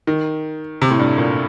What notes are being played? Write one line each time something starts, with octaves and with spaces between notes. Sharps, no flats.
D#3
C3
A2
G2
A#2